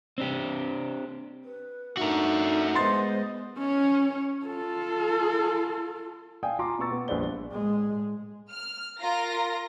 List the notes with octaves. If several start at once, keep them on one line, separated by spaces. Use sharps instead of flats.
C4 D4 G4
B4
A3 D4 D#4 F#4 A#4 E5
G#3 B3 C5 D#5 C6 A6
C#4 C#5
F4 A4
D5 F5 G5 G#5 D#6
F4 A5 A#5 C6 D6
B2 B3 C#6 E6 A6
B3
A#1 G3 B4 C5 D5 G7
A2 G#3
F6
F4 A#4 A#5 A#6